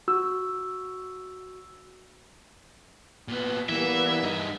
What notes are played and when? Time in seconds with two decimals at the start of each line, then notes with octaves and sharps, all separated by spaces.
0.08 F#4 E6
3.28 A#2 B3
3.69 E3 G3 A#3 B3 E5
4.23 G2 D#4